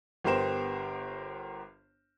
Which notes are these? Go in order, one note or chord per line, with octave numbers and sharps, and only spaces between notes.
G1 B3 G4 A#4 C5 E7